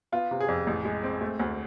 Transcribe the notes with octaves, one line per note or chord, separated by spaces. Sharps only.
B3 F4
C3
G#4
F2
A1
G#3
C4
A3
D2